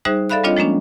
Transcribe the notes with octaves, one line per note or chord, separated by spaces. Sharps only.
G3 D#4 G#4 C5 E5 F#6
A4 D5 E5 F5 B5 F#6
G3 C4 D4 F4 C#5 D#5
F3 G#3 A#3 C#4 D4